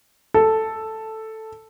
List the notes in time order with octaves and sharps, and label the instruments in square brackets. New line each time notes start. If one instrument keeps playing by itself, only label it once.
[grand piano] A4